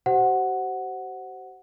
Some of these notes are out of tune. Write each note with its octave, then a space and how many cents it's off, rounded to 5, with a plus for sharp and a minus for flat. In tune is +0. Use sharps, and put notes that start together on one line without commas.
G4 -45 C5 +0 F#5 +0